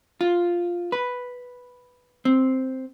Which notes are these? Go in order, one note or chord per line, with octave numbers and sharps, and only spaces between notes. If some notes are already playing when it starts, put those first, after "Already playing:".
F4
B4
C4